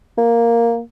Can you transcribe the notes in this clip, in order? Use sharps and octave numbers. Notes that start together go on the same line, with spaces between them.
A#3